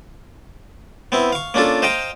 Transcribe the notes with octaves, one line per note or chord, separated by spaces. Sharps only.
B3 C4 E4
F5 C#6
A#3 C#4 D4 F4 A4
C5 D#5 F5 G5 A#5